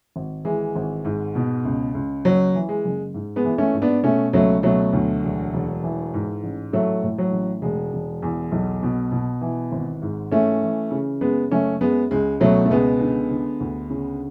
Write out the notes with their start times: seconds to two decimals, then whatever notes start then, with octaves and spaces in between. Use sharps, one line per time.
0.16 G#1
0.45 E3 G#3
0.76 G#1
1.05 G#2
1.35 B2
1.65 C#2
1.95 C#2
2.25 F#1 F#3
2.55 E3
2.69 G#3
2.85 F#1
3.14 G#2
3.36 G#3 B3
3.45 E3
3.58 A3 C#4
3.74 G#2
3.82 B3 D4
4.03 B2 A3 C#4
4.33 C#2 F#3 A3
4.63 B2 F#3 A3
4.93 D2
5.23 E1
5.54 E1
5.83 E3
6.14 G#2
6.44 A1
6.73 A2 F#3 A3
7.03 A2
7.18 F#3
7.32 A1
7.62 E1 G#3
7.93 E1
8.22 E2
8.52 B1
8.83 B2
9.12 B2
9.41 E3
9.72 G#1
10.02 G#2
10.32 E3 A3 C#4
10.62 E3
10.91 C#3
11.21 F#2 G#3 B3
11.51 F#1 A3 C#4
11.81 F#2 G#3 B3
12.11 C#2 G#3
12.40 B2 F#3 A3
12.66 A3
12.71 C#2 G#3 B3
13.00 D3
13.31 D3
13.60 D2
13.90 C#3